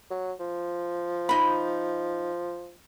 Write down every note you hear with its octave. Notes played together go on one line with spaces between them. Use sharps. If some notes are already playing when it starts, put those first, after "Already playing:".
F#3
F3
D#4 B5